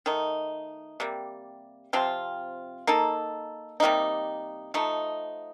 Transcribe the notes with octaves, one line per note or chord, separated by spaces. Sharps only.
D#3 A3 D#4
C3 G3 A#3
C3 F3 C4 F4
A#3 D#4 A4
C3 G3 A#3 D#4
F3 A3 D#4